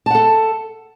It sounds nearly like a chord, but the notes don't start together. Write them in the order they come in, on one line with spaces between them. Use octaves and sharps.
A5 F#5 A4